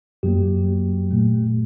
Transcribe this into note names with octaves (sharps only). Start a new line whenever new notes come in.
F#2 F#3 A#3 G4
A#2 A3